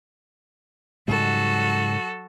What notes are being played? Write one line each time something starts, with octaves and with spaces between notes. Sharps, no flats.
G#2 C#3 F#3 G3 F#4 A4